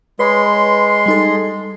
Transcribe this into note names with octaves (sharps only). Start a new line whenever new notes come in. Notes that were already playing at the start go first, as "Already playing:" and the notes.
G#3 B4 C#5 B5 C6
G3 D#4 A4